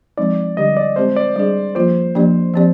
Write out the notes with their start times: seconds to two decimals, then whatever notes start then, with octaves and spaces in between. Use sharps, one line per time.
0.17 F3 G#3 C4 D#4 D5
0.57 D3 G3 D4 G4 D#5
0.77 D5
0.96 G#3 C4 G4 C5
1.16 D5
1.36 G3 D4 G#4 D5
1.75 F3 A#3 F4 C5
2.15 F3 A#3 D4 G4 D5
2.54 F3 C4 G4 D5